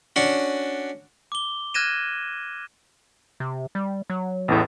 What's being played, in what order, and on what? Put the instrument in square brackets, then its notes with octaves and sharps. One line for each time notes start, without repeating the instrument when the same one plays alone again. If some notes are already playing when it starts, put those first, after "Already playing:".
[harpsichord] C#4 D4 F#4 F#5
[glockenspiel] D6 G7
F6 F#6 G#6 A#6 D#7 E7
[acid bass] C3
G3
F#3
[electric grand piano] A1 E2 A2